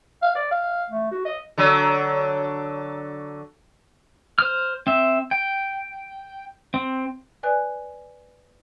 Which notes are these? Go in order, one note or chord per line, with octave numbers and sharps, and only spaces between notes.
F5
D5
F5
A3
F#4
D#5
D3 F#3
C5 F6
C4 E5
G5
C4
B4 D5 G#5 F#6